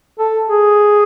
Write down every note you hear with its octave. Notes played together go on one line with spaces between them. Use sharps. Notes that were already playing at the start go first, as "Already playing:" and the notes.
A4
G#4